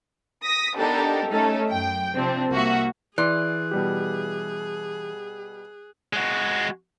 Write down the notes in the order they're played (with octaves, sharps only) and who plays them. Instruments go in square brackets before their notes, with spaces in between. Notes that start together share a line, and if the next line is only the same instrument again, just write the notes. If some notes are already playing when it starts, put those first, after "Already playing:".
[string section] D#6 A#6 B6
B3 D4 D#4 G4 A4 A#4
A3 C#4 D#4 A4
F#2 G5
C3 F3 C4 D4
C2 A#3 F#4 E5
[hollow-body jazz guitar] E3 [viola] G#4 [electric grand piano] D5 C6 D6 [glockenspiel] F#6
[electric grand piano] B2 G3 G4
[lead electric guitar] G#3 F#4